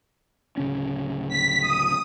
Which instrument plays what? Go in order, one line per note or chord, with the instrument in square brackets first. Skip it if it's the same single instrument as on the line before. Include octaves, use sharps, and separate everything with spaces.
[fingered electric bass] D1 C#3 C#4
[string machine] B6
D#6